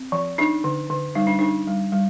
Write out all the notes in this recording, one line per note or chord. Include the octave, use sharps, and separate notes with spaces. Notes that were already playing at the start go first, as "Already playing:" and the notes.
Already playing: C4
F3
D4 D#4
D3
D3
G3 D#4
D4
D4 D#4
G3
G3